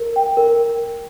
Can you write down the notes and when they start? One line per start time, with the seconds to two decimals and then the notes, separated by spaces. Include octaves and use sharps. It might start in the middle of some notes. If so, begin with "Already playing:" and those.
Already playing: A#4
0.16 G5
0.37 A#4